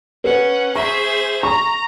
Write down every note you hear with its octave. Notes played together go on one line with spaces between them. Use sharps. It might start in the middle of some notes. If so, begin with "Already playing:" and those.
C#4 B4 F#5
G#4 C5 E5 C#6
A#5 C#6